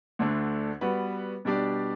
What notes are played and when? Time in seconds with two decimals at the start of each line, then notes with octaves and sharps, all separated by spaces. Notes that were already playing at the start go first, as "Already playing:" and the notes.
0.19 D2 D3 A3 D4
0.81 G3 B3 F#4 B4
1.45 B2 G3 D4 G4 D5